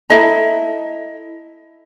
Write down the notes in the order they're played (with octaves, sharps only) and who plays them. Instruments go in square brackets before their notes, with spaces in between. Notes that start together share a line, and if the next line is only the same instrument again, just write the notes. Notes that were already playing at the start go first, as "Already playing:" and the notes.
[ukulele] E4 A4 D#5 A#5